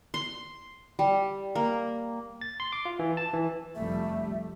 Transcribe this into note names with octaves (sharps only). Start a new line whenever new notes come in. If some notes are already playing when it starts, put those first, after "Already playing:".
C6
G3
A#3
A6
C6
D6
F4
E3
A5
E3
F1 G3 A3 E5